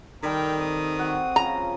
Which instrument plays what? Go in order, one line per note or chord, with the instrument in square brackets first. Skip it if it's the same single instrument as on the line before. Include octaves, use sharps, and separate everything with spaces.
[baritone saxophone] D#3 [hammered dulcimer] G3 A4 [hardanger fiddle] A#4 G5
[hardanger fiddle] C4 D#6
[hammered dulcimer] F#4 F#5
[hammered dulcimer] C#3 F3 [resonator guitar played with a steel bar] A#5